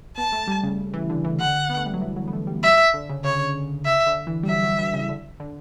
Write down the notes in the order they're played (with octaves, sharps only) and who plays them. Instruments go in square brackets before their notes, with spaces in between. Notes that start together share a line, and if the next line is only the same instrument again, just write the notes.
[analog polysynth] B3 [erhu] A5
[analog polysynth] A3
G3
C#3
E3
D3
E3
[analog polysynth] D3 [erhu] F#5
[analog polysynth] B3
A3
G3
F#3
E3
F#3
B3
A3
G3
[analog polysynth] G3 [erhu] E5
[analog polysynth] D3
C#3
[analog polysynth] C#3 [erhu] C#5
[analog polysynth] C#3 [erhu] E5
[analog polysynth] D3
E3
G3
[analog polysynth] F#3 [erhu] E5
[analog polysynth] F#3
E3
C#3
D3
D3